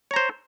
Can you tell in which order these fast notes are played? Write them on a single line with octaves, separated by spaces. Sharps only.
C#5 A#5 C5